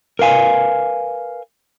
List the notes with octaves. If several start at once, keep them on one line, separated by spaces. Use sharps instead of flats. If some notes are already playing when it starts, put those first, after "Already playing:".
A#4 B4 F5 G#5